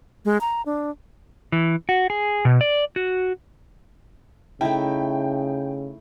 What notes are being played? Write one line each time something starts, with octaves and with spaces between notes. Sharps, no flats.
G#3
A#5
D4
E3
F#4
G#4
B2
D5
F#4
C#3 A3 D#4 E4 G5